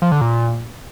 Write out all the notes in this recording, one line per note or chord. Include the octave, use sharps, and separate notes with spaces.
F3
D3
A#2